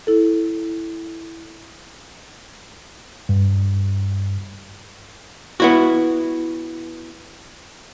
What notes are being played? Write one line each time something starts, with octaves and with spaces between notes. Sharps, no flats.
E4 A4
G2
B3 E4 F#4